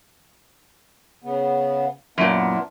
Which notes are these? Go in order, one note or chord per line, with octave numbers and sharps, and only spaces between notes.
C#3 B3
F#2 A#2 B3 D4 E4